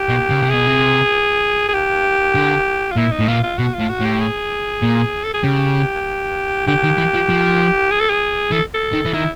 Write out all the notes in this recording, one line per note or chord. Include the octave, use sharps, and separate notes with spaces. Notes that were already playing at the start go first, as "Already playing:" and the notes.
Already playing: G4
B2
C#3
C3
B2 G#4
C3
G#4
G4
D3
F4
A#2 E4
D#4
A2
A#2 F4
F4
B2 F#4
A2 F4
F#4
A2
G4
G#4
A#2
A4
G#4
C#3 G4
D3 G4
D#3
E3
F3
F3
G#4
A4
G#4
E3 A4
A4
D#3
E3
D#3 E4